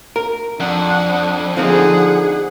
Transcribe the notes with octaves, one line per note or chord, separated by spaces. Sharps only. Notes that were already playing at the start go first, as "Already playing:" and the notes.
A#4
F2 D4 F#5
D3 F3 C4 D#4 G#4 F#5